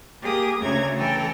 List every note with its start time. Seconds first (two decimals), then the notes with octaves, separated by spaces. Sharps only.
0.21 A#3 G4 G#4 D#6
0.61 D2 C#3 A3 C#4 A#5 G#6
0.98 E3 A4 G5 G#5 A#5